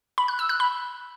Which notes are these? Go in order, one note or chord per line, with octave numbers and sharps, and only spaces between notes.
B5
F#6
E6
F#6
B5